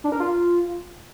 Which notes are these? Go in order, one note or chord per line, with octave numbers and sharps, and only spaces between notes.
D4
A#4
F4